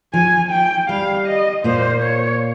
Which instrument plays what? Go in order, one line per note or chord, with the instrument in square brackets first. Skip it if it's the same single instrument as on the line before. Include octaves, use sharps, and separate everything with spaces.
[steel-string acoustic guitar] F3 [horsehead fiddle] G#5
[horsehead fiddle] G5
[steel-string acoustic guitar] G3 [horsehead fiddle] F5
[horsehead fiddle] D#5
[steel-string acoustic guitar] A#2 A#3 [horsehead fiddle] C5
[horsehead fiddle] C#5